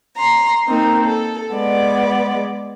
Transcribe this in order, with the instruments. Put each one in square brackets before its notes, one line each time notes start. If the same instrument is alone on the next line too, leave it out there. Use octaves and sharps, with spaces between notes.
[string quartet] A#5 C6
A#3 C4 D#4 A#4
A4
G#3 B3 D5